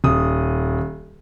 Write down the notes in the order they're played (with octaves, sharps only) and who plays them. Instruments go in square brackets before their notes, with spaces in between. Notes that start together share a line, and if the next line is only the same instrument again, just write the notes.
[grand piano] D#1 D#6